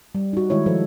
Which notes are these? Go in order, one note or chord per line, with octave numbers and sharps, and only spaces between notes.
G3
D#4 F#4
D#3 G#3 E4 C#5
F3 A4